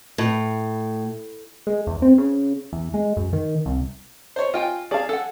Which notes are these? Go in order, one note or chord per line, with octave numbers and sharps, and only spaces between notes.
A2
G#3
E2
C4
C#3
E2
G#3
F#2
D#3
C2
C5 C#5
F4 D#5 G5 G#5
G#4 D5 F5 A5
A4 F#5